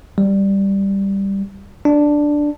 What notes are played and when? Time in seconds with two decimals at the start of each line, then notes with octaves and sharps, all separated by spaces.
0.18 G3
1.85 D4